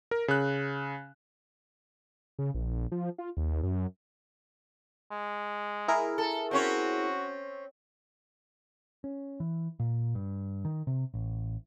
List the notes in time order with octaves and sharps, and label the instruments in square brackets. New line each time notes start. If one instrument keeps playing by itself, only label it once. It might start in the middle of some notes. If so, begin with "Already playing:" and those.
[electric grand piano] A#4
C#3 F#6
[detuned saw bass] C#3
A#1
F3
F4
D#2
F#2
[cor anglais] G#3
[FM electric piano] E4 G#4 A#4
[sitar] A4
[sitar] C4 C#4 C#5 [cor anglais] F#4
[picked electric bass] C#4
E3
A#2
G2
D#3
C3
A1